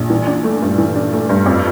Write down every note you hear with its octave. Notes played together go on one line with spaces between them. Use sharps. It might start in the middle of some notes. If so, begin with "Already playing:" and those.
Already playing: A#1
E3
D4
A3
G2
E3
D4
A3
G2
F2